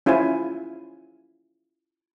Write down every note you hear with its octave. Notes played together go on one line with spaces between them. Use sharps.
C#4 E4 F4 G#4 C5 G#5